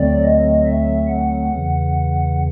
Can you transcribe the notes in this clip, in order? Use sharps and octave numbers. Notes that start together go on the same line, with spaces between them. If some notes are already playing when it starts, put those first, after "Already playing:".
Already playing: D2 D3 F#3 A3 C4 D5
D#5
E5
F#5
E2 C#3 E3